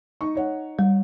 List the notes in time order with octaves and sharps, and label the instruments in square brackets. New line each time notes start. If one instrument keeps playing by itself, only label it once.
[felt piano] D#4 C#6
D#4 C#5 F#5
[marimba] G3